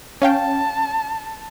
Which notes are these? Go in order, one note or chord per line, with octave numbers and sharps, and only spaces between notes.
C#4 F5 G5 A5